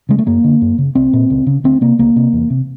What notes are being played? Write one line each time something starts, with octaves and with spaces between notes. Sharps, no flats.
C#3 G#3
A3
F#2 A#3
D3
F#2
C#3
C2 C4
A#2
C#2
C#3
D2 C4
C3 A#3
C#2 A#3
C3
E2
C3